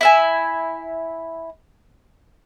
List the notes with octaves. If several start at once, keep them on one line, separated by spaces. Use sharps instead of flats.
E4 E5 G#5